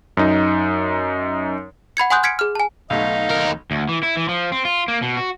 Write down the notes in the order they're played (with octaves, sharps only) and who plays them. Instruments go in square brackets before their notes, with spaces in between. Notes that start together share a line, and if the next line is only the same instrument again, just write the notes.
[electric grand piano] F#2 D#4
[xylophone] F#5 B5 G#6 C#7
F#5 G#5 C6 D#6 F#6 G6
F6 G#6 B6 C#7 D7
G#4 F6
G#5 A5
[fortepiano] B1 A3 [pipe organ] D#4 [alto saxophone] F5
[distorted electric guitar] D#2 A#4
[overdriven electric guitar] D2
E3
E4
E3
F3
C4
F4
A#3
B2
F#4